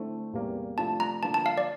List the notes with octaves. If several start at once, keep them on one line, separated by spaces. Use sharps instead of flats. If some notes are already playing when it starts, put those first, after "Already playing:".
Already playing: D3 A3 C4 E4
E2 C3 G3 A#3
C3 F3 A3 D4 F4 A5
A#5
D3 F3 A#3 A5
A5
F5
D5